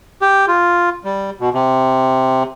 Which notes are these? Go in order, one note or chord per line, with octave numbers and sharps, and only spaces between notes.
G4
F4
G3
B2
C3